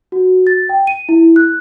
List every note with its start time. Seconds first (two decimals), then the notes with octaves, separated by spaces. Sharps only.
0.12 F#4
0.47 A6
0.69 G5
0.87 D#7
1.09 E4
1.36 F#6